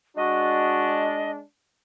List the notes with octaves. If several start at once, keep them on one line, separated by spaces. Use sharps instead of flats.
G#3 D4 F#4 D#5